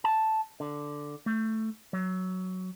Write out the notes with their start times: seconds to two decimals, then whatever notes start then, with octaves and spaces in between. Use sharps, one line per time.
0.04 A5
0.60 D3
1.26 A3
1.93 F#3